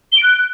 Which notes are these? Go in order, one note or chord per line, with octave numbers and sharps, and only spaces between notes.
G7
D7
F#6